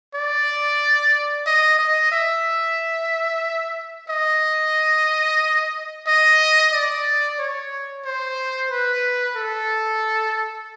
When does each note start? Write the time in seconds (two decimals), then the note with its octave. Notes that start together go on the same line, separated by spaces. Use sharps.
0.14 D5
1.46 D#5
1.79 D#5
2.12 E5
4.09 D#5
6.07 D#5
6.73 D5
7.39 C#5
8.05 C5
8.71 B4
9.36 A4